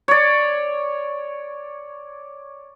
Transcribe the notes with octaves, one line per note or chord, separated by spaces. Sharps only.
C#5 D5